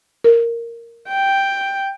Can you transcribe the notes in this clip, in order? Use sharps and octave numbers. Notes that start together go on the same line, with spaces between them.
A#4
G5